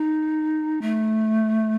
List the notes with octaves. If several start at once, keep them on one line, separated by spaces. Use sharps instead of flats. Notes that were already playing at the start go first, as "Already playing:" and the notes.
Already playing: D#4
A3